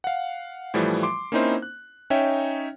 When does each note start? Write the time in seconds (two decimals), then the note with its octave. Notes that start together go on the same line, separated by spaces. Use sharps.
0.04 F5 F#5
0.74 A2 E3 F3 G3 A3
1.03 C6 D6
1.32 A#3 C4 C#4 D#4 E4 C5
1.62 F#6
2.10 C#4 D#4 C#5 E5 G5